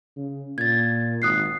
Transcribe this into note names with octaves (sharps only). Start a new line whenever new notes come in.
C#3
A#2 G#6 A6
G#1 D#6 F#6 C7